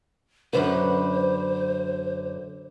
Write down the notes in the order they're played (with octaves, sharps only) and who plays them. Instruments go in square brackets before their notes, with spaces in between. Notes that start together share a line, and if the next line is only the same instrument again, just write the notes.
[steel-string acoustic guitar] F#2 D3 B4 [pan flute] C5